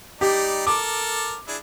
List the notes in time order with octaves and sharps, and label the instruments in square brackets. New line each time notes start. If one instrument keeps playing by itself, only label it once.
[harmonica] G3 D#4 D5 [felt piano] G4
[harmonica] A4 A#4 [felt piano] D6
[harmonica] D4 E4 G#4